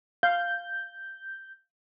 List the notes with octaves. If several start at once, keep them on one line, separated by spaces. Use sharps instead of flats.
F5 G6